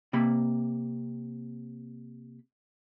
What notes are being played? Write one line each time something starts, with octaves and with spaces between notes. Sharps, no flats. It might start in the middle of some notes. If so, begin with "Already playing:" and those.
C3 A#3 B5